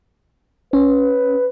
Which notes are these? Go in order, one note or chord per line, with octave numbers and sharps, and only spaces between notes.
C#4 B4